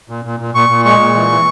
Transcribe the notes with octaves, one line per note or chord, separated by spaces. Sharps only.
A#2
A#2
A#2
A#2 C#6
A#2
G#3 C#6
A#2
E3
E3